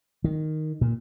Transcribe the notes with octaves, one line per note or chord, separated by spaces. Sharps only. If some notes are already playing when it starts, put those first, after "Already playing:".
D#3
A#2